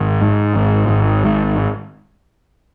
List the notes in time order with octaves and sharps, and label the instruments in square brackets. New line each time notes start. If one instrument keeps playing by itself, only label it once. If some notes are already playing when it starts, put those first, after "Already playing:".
Already playing: [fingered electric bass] G#1
G#2
G#1
G#1
G#2